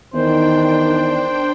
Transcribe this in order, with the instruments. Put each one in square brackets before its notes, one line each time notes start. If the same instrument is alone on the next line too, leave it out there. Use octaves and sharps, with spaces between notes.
[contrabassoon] E2 [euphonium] D#3 [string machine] D4 G5 [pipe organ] C5